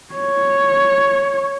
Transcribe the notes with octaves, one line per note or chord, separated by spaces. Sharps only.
C#5